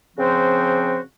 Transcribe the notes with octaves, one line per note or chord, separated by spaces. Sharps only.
C#3 F3 C4 F#4 C5